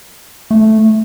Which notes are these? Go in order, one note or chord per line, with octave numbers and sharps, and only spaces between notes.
A3